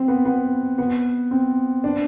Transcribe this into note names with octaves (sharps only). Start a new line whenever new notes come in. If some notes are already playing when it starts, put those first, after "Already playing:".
Already playing: C4
B3
B3
B3
C4
D4